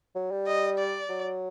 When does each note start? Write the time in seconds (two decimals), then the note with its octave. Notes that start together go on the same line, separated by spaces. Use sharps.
0.15 F#3
0.31 G3
0.47 D#5
0.78 D5
1.10 F#3